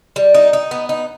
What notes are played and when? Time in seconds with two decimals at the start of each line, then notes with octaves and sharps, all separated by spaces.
0.16 G3
0.34 D#4
0.53 D#4
0.71 B3
0.89 D#4